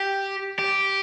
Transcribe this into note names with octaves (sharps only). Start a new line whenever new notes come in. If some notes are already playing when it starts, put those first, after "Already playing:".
Already playing: G4
G4